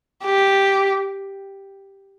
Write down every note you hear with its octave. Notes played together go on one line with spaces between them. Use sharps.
G4